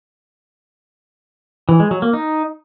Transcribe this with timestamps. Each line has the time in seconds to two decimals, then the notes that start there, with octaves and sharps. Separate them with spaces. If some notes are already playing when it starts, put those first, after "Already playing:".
1.69 E3
1.80 G#3
1.91 F#3
2.02 A#3
2.13 D#4